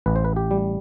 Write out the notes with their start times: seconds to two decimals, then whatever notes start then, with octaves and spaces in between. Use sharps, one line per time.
0.06 A1 B4
0.16 C5
0.25 B4
0.36 G4
0.51 G3